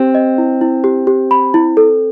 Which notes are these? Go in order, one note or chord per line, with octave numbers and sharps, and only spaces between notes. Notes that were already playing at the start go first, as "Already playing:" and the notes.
Already playing: C4 G4
D#5
E4
E4
G4
G4
B5
E4
A4